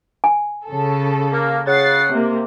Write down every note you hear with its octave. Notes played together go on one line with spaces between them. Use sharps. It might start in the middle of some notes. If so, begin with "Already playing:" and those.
G#5
C#3 A4
A#3
C#3 F#5 A6 C7
C3 A#3